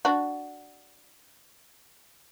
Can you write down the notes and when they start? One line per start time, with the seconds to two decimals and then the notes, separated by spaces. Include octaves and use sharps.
0.05 D4 F#4